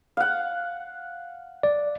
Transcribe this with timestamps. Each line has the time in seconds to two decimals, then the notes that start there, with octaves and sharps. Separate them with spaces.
0.17 F5 F#5
1.63 D5